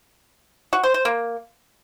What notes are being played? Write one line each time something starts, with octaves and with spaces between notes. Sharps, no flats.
F#4
C5
C5
A#3